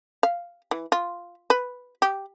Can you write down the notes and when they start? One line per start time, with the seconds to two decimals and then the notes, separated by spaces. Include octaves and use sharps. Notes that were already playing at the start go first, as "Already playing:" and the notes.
0.23 F5
0.71 E3
0.92 F4
1.50 B4
2.02 G4